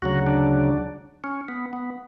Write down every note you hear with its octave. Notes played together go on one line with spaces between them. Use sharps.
D2 C#3 F#3 F#4
D4
C#4
B3
B3